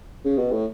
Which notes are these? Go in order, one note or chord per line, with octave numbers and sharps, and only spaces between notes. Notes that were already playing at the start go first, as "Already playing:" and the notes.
C#3
B2
A2